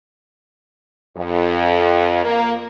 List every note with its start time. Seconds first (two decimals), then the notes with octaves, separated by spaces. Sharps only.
1.17 F2
2.25 A#3